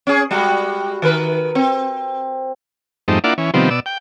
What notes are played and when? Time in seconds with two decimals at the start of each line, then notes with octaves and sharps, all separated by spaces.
0.07 C#4 G#4
0.31 G3 G#3 F#4
1.02 D#3 A#4 B4
1.55 C4
3.08 F2 G#2 G3 A3 C4 D#4
3.24 A#3 D4 E4 F4 D5 F#5
3.38 E3 C#4
3.54 C3 D#3 F3 G3 B3 C4
3.70 B2 D5 E6
3.86 G5